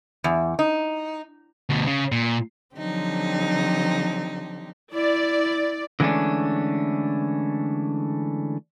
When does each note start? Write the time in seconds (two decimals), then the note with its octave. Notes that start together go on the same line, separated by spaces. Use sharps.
0.24 E2
0.59 D#4
1.69 D2 B2
1.87 C#3
2.12 A#2
2.77 D3 F3 F#3 C4 D#4 G4
4.93 E4 D5
6.00 D3 E3 G#3 A3 C#4 D4